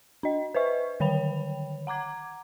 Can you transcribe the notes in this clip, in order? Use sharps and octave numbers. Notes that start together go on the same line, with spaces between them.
D4 D#5
B4 C5 D#5 E5 C#6
D3 D#3 C#5 G5 B5 F7
F#5 A#5 D6 G#6